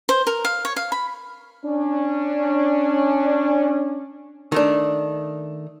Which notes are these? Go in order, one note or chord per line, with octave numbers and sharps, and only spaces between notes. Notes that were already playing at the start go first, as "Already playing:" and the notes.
C5
A#4
F5
C#5
F5
B5
C#4 D4
D#3 A3 D4